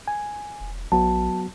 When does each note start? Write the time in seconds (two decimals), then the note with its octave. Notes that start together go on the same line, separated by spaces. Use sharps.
0.08 G#5
0.61 E1
0.92 A#1 F#3 B3 F#4 A5